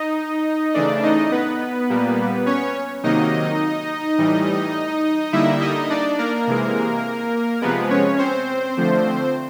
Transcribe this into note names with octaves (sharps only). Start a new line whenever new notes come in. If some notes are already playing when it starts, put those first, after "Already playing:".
Already playing: D#4 D#5
C#3 E3 A3 D4 D5
D#4 D#5
B3 B4
A#2 G3 A#3
C#4 C#5
C3 D#3 F#3 A#3 D#4 D#5
A2 E3 G3
D3 G3 A#3 E4 E5
D#4 D#5
D4 D5
A#3 A#4
C3 E3 G#3
C3 F3 G#3 B3 B4
C#4 C#5
C4 C5
D3 F3 A3